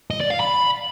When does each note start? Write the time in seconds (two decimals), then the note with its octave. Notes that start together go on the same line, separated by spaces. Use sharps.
0.11 D#5
0.21 D5
0.31 F5
0.41 B5